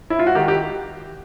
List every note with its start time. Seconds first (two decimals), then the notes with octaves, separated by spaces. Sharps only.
0.10 E4
0.19 F4
0.27 F#4
0.35 D#3 G4
0.48 G4